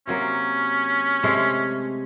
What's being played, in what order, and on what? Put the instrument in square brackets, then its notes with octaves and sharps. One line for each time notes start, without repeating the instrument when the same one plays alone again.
[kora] C3 F#3 A#3 [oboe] C#4
[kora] C3 G#3 A3